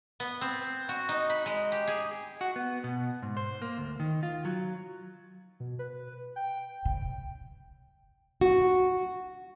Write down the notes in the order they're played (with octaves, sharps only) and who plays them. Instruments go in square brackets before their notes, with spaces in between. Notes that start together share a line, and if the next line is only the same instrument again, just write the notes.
[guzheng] B3
C4
F#4
D#4
B5
G#3
G4
G#4
[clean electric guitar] F#4
B3
B2
G#2
C5
A#3
D2
D#3
F4
F#3
[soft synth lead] B2
B4
G5
[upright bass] C#3
[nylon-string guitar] F#4